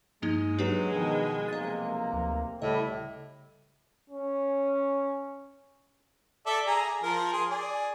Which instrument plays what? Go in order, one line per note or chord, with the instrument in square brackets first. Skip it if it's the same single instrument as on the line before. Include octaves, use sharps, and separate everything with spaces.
[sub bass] G2 [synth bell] F3 A#3 D#4 [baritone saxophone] G#3
[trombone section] F#3 [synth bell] D4 G4 B4
[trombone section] B2 D#3 [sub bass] F3
[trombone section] B1 C3 A#3 [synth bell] D#5 A6
[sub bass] D2
[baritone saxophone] A2 [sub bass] C#3 [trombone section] G3 E4 [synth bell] D#5
[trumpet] C#4
[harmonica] A4 D5 E5
G#4 A#5
F3 A#4
G#4 C6
G#4 D5